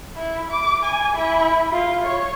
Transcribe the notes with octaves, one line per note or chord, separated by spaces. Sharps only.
E4
D6
G#5
E4
F4
C#5